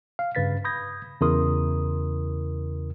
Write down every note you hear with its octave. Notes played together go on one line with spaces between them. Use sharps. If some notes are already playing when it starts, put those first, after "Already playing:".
F5
G2 C#3 B4 A6 B6
B5 D#6 G6 G#6 A#6
E2 C#3 E4 A#4 C6 D#6